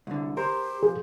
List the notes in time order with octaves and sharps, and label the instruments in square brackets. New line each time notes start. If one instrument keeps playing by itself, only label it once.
[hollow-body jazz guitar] C2 D3
[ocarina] G4 [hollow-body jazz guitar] A#4 [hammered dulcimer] C5
[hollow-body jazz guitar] F2 [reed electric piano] G#4